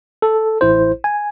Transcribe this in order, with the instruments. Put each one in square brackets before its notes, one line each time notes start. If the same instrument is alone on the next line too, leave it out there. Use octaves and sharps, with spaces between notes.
[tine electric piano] A4
A1 E4 C5
G#5